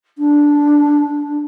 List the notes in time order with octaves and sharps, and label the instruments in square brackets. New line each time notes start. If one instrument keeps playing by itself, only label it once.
[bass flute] D4